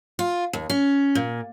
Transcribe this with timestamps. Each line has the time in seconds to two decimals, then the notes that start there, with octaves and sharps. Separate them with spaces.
0.19 F4
0.53 D#2
0.70 C#4
1.15 A#2